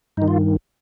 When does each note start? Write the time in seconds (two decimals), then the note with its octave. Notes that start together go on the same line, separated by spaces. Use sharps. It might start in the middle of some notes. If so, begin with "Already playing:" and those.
0.17 G2 D#3 D#4
0.28 F4